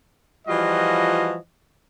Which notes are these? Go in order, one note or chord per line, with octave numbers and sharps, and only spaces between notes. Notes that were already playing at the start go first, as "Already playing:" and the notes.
E3 F3 G3 F4 F#4 D#5